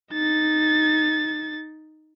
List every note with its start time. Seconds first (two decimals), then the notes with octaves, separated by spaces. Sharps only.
0.12 D#4 A6